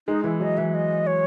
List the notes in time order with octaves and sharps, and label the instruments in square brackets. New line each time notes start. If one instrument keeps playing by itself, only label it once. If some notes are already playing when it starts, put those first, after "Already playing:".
[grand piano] G#3 [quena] D#4
[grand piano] E3 [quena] E4
[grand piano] F#3 [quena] D#5
[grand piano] E3 [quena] E5
[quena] D#5
C#5